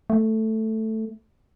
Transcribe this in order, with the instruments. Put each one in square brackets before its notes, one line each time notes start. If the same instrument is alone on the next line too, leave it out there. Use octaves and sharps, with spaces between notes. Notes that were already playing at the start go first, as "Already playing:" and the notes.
[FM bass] A3